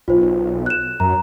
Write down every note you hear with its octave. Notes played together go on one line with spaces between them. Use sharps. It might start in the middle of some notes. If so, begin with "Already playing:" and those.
B1 F4 C5
F#6 E7
F#2 A#5